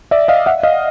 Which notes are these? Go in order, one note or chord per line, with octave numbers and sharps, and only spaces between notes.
D5 E5
D#5 F5
E5 F#5
D#5 F5